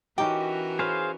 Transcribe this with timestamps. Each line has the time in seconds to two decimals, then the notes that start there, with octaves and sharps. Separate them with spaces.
0.18 E3 C#4 D#4 F#4 G4 A#4 G5
0.79 C#4 G#4 B4 C5 F5